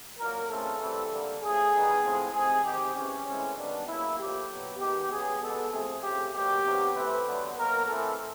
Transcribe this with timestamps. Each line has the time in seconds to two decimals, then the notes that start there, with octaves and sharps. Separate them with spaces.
0.19 A#2 F#3 A#3 A#4
0.50 C#3 E3 A3 C4 A4
0.81 E3 G3 C4
1.11 D3 G3 A#3
1.42 C#3 F3 A3 G#4
1.73 D#3 G3 B3
2.03 A2 F3 G#3 C4
2.34 C3 D#3 G#3 C4 G#4
2.65 D#3 G#3 C4 G4
2.96 E3 G#3 C4 C#4
3.27 A2 E3 G#3 C4 C#4
3.57 D#3 G3 B3 D4
3.87 C#3 F#3 A#3 E4
4.18 A#2 F3 A3 G4
4.50 B2 F#3 B3
4.79 D#3 G#3 B3 G4
5.11 C#3 F#3 B3 G#4
5.41 B2 G#3 B3 A4
5.72 C3 F3 A3 C4 G#4
6.03 C#3 F3 A3 C4 G4
6.34 B2 F#3 A#3 G4
6.65 C3 D#3 F#3 B3
6.95 C3 E3 A3 C4 B4
7.25 D3 F#3 B3
7.57 B2 F#3 A#3 A#4
7.87 A2 E3 A3 C4 A4